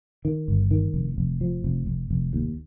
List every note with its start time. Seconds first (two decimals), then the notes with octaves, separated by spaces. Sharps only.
0.25 D#3
0.48 G1
0.71 D#3
0.94 F1
1.18 F1
1.41 F3
1.64 F1
1.87 F1
2.11 F1
2.33 D#2